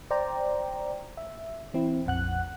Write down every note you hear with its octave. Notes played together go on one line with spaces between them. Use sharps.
C5 D5 G5 A#5
E5
E3 C4 E4
A#1 F2 F#5 F#6